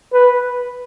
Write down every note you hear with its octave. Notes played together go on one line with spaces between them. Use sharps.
B4